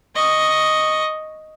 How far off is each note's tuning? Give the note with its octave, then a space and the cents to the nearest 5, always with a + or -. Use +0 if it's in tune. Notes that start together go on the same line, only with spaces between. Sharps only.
D#5 +0 C#6 +0